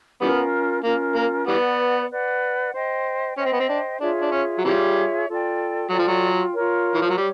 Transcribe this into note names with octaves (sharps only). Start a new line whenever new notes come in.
E3 G3 B3 C#4 F4 A#4
A#3 C#4 F4 A#4
A#3
E3 G3 B3 B4 D5 F#5
B4 D5 F#5
C5 D#5 G5
C#4 C5 D#5 G5
C4
B3
C4
D4
D4 F4 G#4 C#5 E5
D4
C#4
F#3
C3 E3 G3 F4 G#4 C#5 E5
F4 A4 D5 G5
F#3 F4 A4 D5 G5
F3
F#3
F4 A#4 C#5
E3
F3
F#3
G3 C#5